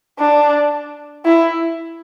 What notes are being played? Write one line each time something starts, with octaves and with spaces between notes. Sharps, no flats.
D4
E4